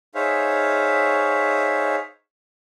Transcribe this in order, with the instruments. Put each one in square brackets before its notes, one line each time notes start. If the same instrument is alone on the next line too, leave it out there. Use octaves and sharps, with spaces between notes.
[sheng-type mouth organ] D#4 G#4 C5 C#5 E5 F5